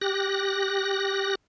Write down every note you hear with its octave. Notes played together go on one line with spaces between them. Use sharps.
G4 F#6 A#6